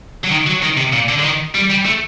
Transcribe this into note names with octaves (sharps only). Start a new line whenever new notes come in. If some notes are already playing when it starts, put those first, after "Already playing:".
F#3
D#3
F#3
D#3
C3
A#2
D3
D3
D#3
G3
G3
A3